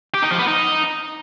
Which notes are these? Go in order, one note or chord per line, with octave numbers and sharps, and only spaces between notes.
G4
D#4
F3
B3
D#4